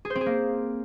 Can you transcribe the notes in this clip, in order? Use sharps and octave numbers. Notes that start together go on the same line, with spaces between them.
G#4
C5
C4
G#4
A#3